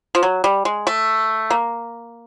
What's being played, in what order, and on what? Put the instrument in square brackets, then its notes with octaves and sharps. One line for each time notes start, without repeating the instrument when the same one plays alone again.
[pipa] F3
F#3
G3
G#3
A3
A#3